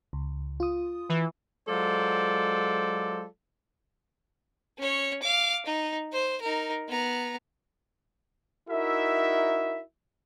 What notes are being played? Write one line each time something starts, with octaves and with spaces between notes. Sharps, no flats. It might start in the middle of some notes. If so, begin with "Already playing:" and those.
C#2
F4 D#6
E3
F#3 G#3 F4 A4 C5 D5
C#4 C#5
F5 D6
D#4
C5
D#4 A#4
B3 A#5
D#4 E4 F#4 A#4 E5